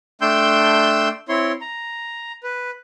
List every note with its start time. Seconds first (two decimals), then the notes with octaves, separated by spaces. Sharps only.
0.22 A3 D4 G5 C6 E6 G6
1.29 C4 E4 C#5 C6
1.61 A#5
2.43 B4